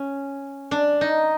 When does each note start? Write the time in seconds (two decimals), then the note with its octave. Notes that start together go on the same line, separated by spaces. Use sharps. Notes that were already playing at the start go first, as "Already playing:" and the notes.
Already playing: C#4
0.71 D4
1.01 D#4